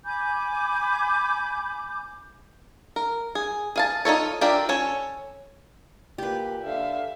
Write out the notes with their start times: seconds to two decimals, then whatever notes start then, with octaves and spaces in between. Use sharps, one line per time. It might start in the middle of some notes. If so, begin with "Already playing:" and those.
0.05 G#5 B5 D6 G6
2.96 A#4
3.35 G#4
3.76 G#4 F5 A5
4.05 D#4 F4 A4 C#5
4.41 D4 F4 G4 A#4 E5
4.69 C#4 A4 C#5
6.18 A#2 G4 B4
6.64 D3 E5 F5